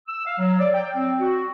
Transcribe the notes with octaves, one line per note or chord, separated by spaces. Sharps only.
E6
F5
F#3
D5
G5
C4
F#4